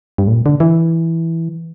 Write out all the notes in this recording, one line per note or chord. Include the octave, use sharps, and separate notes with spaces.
G2
A2
A#2
D3
E3